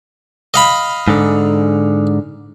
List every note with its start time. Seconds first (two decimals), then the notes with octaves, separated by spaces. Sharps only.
0.54 D#5 F5 B5
1.08 G#2 D3